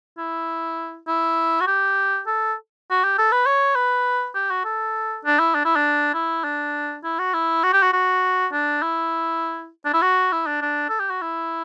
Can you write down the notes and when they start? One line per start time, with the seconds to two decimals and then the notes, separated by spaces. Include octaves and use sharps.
0.18 E4
1.07 E4
1.60 F#4
1.67 G4
2.27 A4
2.91 F#4
3.04 G4
3.18 A4
3.32 B4
3.46 C#5
3.75 B4
4.35 G4
4.51 F#4
4.65 A4
5.25 D4
5.39 E4
5.55 D4
5.65 E4
5.76 D4
6.14 E4
6.44 D4
7.04 E4
7.19 F#4
7.34 E4
7.63 F#4
7.73 G4
7.83 F#4
7.93 F#4
8.53 D4
8.83 E4
9.85 D4
9.93 E4
10.02 F#4
10.32 E4
10.46 D4
10.62 D4
10.89 A4
11.00 G4
11.10 F#4
11.22 E4